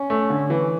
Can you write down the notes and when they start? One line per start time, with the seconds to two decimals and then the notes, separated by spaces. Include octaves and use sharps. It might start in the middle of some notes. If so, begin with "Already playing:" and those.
Already playing: C#4
0.10 A3
0.30 D3
0.50 E3